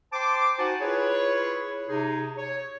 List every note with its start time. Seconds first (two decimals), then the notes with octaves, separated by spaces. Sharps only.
0.13 C5 G5 A5 C6 D6
0.58 D#4 F#4 C5 F#5 G#5 A5
0.81 E4 F4 G#4 B4 C#5
1.89 C3 D#4 G#4
2.38 C#5